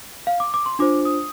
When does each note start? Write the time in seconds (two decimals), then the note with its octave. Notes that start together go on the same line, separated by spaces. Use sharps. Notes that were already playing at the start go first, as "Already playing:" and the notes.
0.27 F5
0.40 D6
0.54 D6
0.66 C6
0.79 D4 F4 C5 D6
1.05 D#6